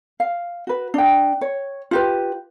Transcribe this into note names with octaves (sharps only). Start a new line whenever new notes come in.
F5
F#4 B4
D4 G5
C#5
F4 G4 B4